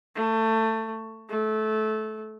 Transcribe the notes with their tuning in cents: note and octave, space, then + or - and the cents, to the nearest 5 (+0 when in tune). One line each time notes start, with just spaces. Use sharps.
A3 +20
A3 -20